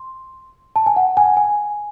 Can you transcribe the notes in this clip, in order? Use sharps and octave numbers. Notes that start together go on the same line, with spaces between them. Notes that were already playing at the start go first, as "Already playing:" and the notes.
Already playing: C6
A5
G#5
F#5
G#5
G#5